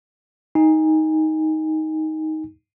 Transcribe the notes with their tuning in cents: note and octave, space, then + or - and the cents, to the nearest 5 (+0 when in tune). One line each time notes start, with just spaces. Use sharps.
D#4 +10 G#5 -25